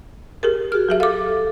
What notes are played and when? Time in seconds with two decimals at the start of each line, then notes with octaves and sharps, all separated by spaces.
0.43 G4 G#4 A#4
0.72 F#4 G#4 F6
0.89 F#3 G4 E5
1.00 A4 F5 D6